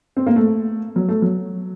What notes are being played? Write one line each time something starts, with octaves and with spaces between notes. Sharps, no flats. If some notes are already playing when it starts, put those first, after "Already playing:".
C4
A#3
A3
F#3
A3
F#3